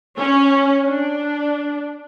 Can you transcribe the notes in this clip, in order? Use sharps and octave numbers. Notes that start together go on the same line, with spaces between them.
C#4
D4